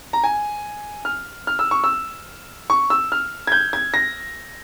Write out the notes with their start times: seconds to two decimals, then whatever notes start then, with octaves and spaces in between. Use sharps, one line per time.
0.13 A#5
0.24 G#5
1.05 F6
1.47 F6
1.59 E6
1.71 C#6
1.84 E6
2.70 C#6
2.90 E6
3.12 F6
3.47 G#6
3.52 G6
3.73 G#6
3.94 A#6